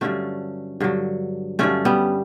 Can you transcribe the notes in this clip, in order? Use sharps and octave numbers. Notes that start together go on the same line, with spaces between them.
G2 D3 F#3 A3 C#4
G2 D3 F#3
G2 D3 F#3 A3 C#4
G3 B3